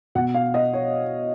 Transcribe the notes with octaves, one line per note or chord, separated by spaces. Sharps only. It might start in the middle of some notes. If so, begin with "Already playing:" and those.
B2 F#5
F5
D#5
C#5